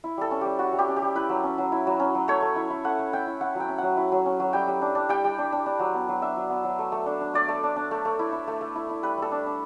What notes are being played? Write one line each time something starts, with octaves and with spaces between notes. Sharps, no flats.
E4
G3 A4
C#4
G3 G4
E4 F#4
G3
G4
C#4
G4
G3
E4 B4
F#3
C#4
F#3
E4
F#3
C#4
F#3
A3 C#5
A3
E4
E4
A3 F#5
A3
E4 G5
E4
E4 F#5
F#3
G5
C#4
F#3 F#5
E4
F#3
C#4
F#3
G3 G5
G3
D4
D4
G3 G5
G3
D4
D4
D4
F#3
B3
F#3
D4 E5
F#3
B3
F#3
A3
A3
D4
D4
A3 D5
A3
D4
D4
A3
A3
E4
E4
A3
A3
E4
E4
G3 B4
G3 A4
D4
D4